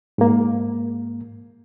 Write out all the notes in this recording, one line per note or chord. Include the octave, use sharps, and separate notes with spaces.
G#2 A#3